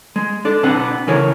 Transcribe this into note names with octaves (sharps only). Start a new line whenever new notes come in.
G#3
D4 A4 D5
B2 B3 C4 D4 D5 F#5
C#3 E3 A#4 C#5